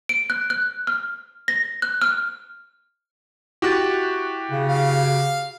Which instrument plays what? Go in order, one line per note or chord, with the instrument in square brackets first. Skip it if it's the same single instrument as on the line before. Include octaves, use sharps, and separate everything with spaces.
[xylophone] D7
F#6
F#6
F6
A#6
F#6
F6
[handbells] E4 F#6 A6 [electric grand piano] F#4 G4
[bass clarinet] C#3
[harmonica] F5